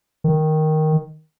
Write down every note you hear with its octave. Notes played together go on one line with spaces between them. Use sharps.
D#3